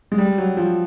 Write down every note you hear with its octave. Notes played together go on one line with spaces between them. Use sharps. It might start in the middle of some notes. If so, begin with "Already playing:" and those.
G#3
G3
F#3
F3